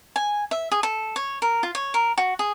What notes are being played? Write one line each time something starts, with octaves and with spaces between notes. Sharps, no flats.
G#5
E5
G#4
A4
C#5
A#4
F4
C#5
A#4
F#4
G#4